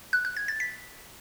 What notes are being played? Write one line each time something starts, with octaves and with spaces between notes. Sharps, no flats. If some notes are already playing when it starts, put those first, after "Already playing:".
F#6
F#6
G#6
A6
B6